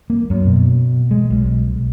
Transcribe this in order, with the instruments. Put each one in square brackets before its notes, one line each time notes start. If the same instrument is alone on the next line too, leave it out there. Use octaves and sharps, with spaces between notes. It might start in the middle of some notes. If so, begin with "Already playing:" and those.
[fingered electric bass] A#3
F#2
B2
G#3
B1